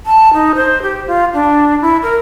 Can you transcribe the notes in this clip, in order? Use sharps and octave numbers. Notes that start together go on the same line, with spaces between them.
A5
D#4
C5
G4
F4
D4
E4
A#4